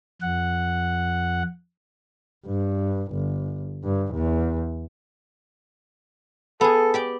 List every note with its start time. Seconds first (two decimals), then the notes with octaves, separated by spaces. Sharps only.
0.22 F2 F#5
2.46 G2
3.13 G1
3.84 G2
4.14 E2
6.61 B3 G#4 A4
6.94 G4 D5 G5